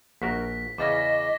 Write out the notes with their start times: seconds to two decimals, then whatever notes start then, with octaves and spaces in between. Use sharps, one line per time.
0.22 A#1 F#4 A#4 B6
0.78 E2 C#3 C#4 D#5 D6 A6 A#6